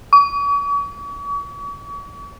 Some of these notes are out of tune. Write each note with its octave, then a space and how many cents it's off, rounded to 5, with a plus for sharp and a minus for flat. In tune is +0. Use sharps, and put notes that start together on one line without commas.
C#6 +45